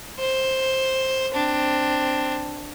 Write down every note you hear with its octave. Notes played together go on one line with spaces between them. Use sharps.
C5
C4 D4